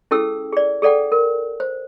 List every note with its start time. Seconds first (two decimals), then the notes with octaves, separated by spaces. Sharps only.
0.11 C#4 E4 G#4 A4 G5 E6
0.53 G#4 D5
0.82 G#4 A4 D5 F#5 G5
1.12 A#4
1.60 C5